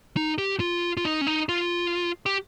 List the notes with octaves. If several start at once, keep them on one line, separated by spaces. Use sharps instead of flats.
D#4
G4
F4
F4
D#4
C#4
D#4
F4
G4